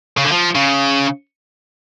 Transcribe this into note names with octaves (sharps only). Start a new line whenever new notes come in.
C#3
D3
F3
C#3